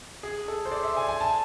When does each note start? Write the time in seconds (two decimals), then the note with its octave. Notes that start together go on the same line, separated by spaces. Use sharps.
0.23 G#4
0.48 A4
0.65 C5
0.71 D5
0.84 E5
0.97 G#5
1.08 G#5
1.21 A5